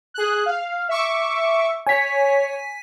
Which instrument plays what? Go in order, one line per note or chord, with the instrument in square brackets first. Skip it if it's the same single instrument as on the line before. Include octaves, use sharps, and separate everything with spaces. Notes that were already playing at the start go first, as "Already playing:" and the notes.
[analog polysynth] G#4 F#6
F5
E5 C#6 D6
[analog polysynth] C#5 [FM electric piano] G#5 B6